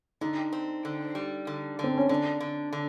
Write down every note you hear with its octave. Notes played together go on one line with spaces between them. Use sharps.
D3 D#4
C4
D3
G3
D3
D3 C4
C#4
D3 D4
D3
D3